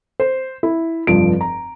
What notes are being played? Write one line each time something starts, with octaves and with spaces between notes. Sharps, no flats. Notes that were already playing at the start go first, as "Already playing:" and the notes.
C5
E4
F1 G2 F3 D7
A#5